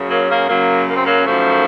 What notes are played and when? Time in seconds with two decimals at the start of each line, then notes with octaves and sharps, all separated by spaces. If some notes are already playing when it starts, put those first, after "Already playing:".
Already playing: F#2 C#3
0.09 F#3 A#3
0.29 A#3 C#4
0.49 F#2 C#3 F#3 A#3
0.88 A#3
0.97 C4
1.06 F#3 A#3
1.26 F#2 D#3 F3 A3